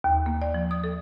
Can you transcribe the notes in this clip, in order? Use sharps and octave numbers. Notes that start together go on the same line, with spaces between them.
D#2
A#3
D5
F3
D#6
A4